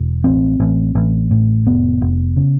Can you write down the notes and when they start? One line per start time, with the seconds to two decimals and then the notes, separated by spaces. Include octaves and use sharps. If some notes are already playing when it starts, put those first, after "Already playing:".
Already playing: E1
0.24 A1 C4
0.60 A1
0.95 A1
1.31 A2
1.66 F1 B3
2.01 F1
2.36 C#3